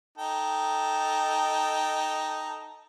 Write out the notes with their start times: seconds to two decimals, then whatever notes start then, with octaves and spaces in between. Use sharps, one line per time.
0.18 D#4 A4 G5